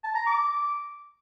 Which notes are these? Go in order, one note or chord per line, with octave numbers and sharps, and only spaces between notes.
A5
A#5
D6